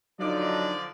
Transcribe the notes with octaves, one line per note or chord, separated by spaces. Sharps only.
D3 F3 F#3 D4 D#4 D5